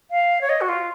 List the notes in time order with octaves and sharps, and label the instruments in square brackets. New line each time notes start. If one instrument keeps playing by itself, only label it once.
[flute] F5
C#5
D#5
F#4
F4